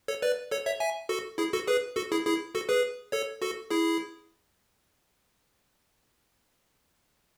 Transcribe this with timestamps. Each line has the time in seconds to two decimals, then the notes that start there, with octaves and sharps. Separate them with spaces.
0.08 A4 C#5
0.22 B4 D5
0.51 A4 C#5
0.66 C#5 E5
0.80 E5 G#5
1.09 F#4 A4
1.38 E4 G#4
1.53 F#4 A4
1.67 G#4 B4
1.96 F#4 A4
2.12 E4 G#4
2.25 E4 G#4
2.55 F#4 A4
2.69 G#4 B4
3.12 A4 C#5
3.42 F#4 A4
3.70 E4 G#4